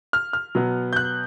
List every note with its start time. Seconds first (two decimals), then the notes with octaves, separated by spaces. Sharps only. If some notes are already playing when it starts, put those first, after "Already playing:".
0.13 F6
0.33 F6
0.55 B2 F#3 B3
0.93 G6
0.96 F#6